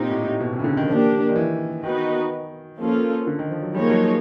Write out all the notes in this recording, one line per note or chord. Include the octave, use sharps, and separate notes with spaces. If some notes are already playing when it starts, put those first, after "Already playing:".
Already playing: A#2 C4 D#4 G4
A2
A2
B2
C3
C#3
D3
D#3
F3 A#3 D4 G4
D#3
E3
D#3 B3 D#4 F#4 B4
F3 A#3 C#4 F4 A4
D3
D#3
F3
F#3
F3 G3 A#3 D#4 G#4 C#5
F#3